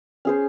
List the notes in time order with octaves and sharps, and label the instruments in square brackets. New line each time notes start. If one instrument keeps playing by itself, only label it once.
[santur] C#4 G#4 C5